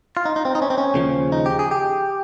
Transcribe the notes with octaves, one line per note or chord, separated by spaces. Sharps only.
F4
D#4
D#4
C4
D#4
C#4
C4
C#4
D#2 C#3 F3
D#4
G4
G#4
G4